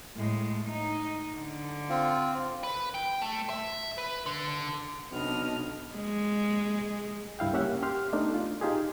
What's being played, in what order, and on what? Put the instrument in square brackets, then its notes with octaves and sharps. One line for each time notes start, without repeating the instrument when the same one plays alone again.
[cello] A2 G#3
D#4
D3
[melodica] C4 F4
[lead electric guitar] B4
G5
A3
E5
B4
D3
[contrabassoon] B1 [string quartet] C3 D#5 F6 [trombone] B3 [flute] D4
[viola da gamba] G#3
[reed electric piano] C#2 G2 E4 F5 G5
A#3 C#4 G4 E5 F#5
G4 C6 F6
A3 B3 D4 D#4
F4
D#4 F4 G4 G#4